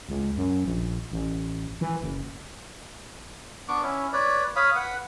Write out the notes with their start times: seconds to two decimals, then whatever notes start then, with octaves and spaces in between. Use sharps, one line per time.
0.09 C#2
0.37 F#2
0.65 A#1
1.12 A1
1.81 E3
2.01 F#1
3.68 B3 D4 C#6 D6
3.83 C#4 E4
4.13 B4 C#5 D5
4.56 C#5 F5 B5 D#6
4.76 B4 F#5